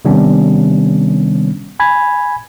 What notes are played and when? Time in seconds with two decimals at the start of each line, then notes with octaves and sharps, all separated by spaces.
0.05 C3 D#3 G3 B3 C#4 D4
1.80 G#5 B5 G#6